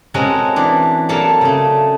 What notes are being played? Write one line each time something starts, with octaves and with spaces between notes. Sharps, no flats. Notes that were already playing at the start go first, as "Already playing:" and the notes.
G#3 C4 C#4 F#4 A4 A#4
E3 D4
F#3 A#3 A4 D5 F5 A5
C#3 A3